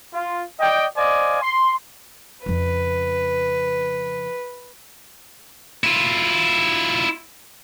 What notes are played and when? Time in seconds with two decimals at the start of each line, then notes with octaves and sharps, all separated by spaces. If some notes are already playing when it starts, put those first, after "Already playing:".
0.14 F4
0.60 D5 D#5 G5
0.97 C5 D5 D#5 F5 G#5
1.42 C6
2.46 F2 C#3 B4
5.84 E4 F4